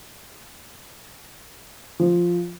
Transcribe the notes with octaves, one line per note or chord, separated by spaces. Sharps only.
F3